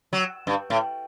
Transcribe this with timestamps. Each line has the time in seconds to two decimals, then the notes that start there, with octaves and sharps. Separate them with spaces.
0.13 F#3
0.47 G2
0.70 A2